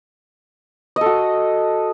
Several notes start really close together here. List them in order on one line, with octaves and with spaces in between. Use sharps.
D#5 A4 F#4